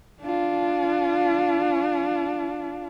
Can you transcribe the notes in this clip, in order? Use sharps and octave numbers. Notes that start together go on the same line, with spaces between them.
D4 F4